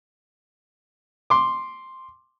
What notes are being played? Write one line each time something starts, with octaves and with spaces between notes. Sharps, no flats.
C6 D6